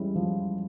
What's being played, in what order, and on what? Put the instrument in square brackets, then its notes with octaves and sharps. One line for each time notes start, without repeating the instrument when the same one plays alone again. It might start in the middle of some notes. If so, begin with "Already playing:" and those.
Already playing: [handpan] E3 G#3 C#4 E4 [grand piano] G3
[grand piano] F3